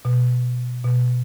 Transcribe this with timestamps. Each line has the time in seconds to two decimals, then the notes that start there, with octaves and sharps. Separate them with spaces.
0.05 B2
0.84 B2